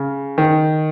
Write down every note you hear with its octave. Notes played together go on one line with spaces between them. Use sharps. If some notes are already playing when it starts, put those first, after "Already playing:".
Already playing: C#3
D#3